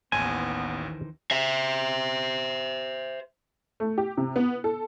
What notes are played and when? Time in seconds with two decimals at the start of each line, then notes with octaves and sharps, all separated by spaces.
0.12 A1 D#2 D#3 E3 B3 C5 G#5
1.31 C5 E5
3.80 A3
3.98 G4
4.17 C3
4.36 B3
4.64 A4